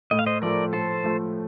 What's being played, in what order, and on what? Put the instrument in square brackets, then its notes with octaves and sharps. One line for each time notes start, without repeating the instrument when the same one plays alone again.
[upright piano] A2 [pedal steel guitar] D#5
[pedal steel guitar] F5
C5 D#5
[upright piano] F3 A3 [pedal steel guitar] A#4 D5
[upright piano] A2 [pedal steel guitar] A4 C5
[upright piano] F3 A3